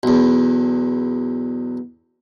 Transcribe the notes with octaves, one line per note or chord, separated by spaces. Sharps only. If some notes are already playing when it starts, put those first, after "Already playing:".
B1 E2